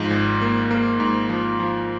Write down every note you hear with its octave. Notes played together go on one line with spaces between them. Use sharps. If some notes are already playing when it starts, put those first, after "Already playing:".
Already playing: G#2 F3
G#1
A#3
A#3
G#2
F3
F3